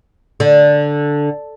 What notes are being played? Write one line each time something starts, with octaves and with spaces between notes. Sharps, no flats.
D3